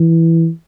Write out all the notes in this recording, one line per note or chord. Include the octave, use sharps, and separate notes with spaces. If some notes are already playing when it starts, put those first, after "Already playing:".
Already playing: E3